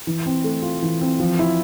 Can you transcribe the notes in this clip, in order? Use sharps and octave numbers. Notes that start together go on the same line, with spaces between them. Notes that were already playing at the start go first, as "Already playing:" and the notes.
E3
C4
A3
F4
E3
C4
F3
E4